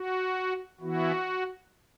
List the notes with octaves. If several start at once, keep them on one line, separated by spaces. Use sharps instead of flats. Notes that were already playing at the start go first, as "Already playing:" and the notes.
Already playing: F#4
E3 B3 E4 F#4